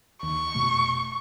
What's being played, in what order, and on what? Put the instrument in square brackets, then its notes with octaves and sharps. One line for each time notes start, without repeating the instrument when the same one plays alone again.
[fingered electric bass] D#2 [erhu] C#6
[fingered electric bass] F1 B2 A3